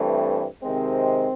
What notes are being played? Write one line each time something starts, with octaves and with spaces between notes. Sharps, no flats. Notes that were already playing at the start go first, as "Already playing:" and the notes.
Already playing: G2 E3 A3 C4
C3 D#3 G#3 C4